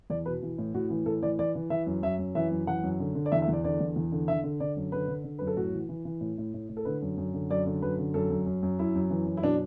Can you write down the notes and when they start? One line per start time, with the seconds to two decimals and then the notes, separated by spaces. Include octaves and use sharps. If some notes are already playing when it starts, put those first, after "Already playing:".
0.10 E2 D5
0.26 B2 B4
0.42 E3
0.58 A2
0.74 A2 F#4
0.90 E3
1.06 A2 A4
1.23 E3 D5
1.39 E3 D5
1.55 E3
1.70 E3 E5
1.86 F#2
2.02 F#2 E5
2.19 F#2
2.35 E3 E5
2.51 F#2
2.67 E3 F#5
2.83 F#2
3.00 D3
3.15 D3
3.26 D5
3.32 E2 E5
3.42 E5
3.48 E2 D5
3.64 D3 D5
3.81 E2
3.96 E2
4.12 D3
4.28 D3 E5
4.44 D3
4.60 D3 D5
4.76 F#2
4.92 D3 B4
5.08 D3
5.24 D3
5.39 F#2 B4
5.47 A4
5.56 A2 F#4
5.73 E3
5.89 E3
6.05 E3
6.21 A2
6.38 A2
6.54 A2
6.69 A2
6.77 A4
6.85 D3 B4
7.02 F#2
7.17 F#2
7.34 D3
7.50 F#2 D5
7.67 D3
7.82 F#2 B4
7.99 D3
8.14 F#2 A4
8.30 F#2
8.46 F#2
8.63 F#2
8.79 F#2 E4
8.95 F#2
9.10 E3
9.26 F#2
9.37 E4
9.43 B2 D4